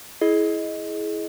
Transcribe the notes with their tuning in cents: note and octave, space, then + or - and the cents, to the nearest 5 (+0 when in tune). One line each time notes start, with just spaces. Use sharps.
E4 +0 G#4 +25 D#5 +5